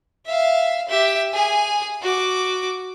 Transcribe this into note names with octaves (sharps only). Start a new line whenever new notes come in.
E5 F5
G4 E5
G#4 G#5
F#4 D6